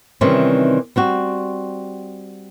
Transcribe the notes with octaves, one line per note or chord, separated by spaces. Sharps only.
C3 D#3 E3 G3 C4 C#4
G3 C4 F#4